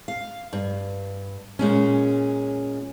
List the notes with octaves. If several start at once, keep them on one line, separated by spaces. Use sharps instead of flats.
F5
G2
A#2 G#3 C#4